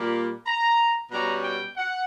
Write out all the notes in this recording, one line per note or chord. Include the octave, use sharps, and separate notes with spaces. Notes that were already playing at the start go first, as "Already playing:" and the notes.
Already playing: A#2 G3 A#3 B5
A#5
B2 G3 C#4 A#5
G5
F#5